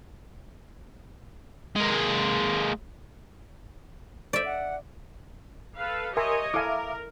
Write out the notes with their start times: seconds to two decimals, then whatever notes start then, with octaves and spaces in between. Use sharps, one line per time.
1.76 G#3 A#3
4.33 C5 D5 E5
4.45 F#5
5.77 A4 B4 F5
6.17 G4 A#4 C#5 D#5 E5 G#5 C6
6.54 E4 A4 A#4 E5 F5 G#5 D6